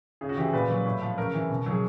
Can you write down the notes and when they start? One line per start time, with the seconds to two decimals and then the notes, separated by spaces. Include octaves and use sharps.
0.21 C#3 G#4
0.29 F#4
0.37 E3 G4
0.45 G#4
0.53 A#2 B4
0.70 F#3
0.85 A2
1.02 F3
1.18 C#3 A#4
1.34 E3
1.49 B2
1.66 F#3 G#4